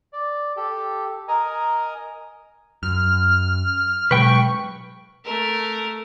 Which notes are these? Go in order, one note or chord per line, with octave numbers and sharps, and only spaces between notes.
D5
G4 A4
A#4 D#5 G#5 A#5
F#2 F6
B2 F#3 G#3 B4 G5 C#6
A3 A#4